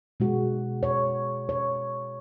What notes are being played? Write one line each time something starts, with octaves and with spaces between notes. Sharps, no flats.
B2 G#3 F#4
C#5
C#5